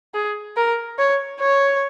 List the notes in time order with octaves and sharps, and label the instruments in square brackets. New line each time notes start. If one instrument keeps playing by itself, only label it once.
[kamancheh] G#4
A#4
C#5
C#5